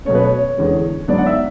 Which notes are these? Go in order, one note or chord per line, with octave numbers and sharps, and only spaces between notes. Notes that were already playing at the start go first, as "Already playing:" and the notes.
B2 F#3 A3 C#4 C#5
B4
C#5
E2 D3 G#3 C#4
G#2 F#3 B3 D4 D5
F#5
E5